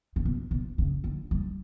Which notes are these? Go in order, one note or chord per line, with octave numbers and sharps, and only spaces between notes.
C#3
B2
B2
C#3
D3
G3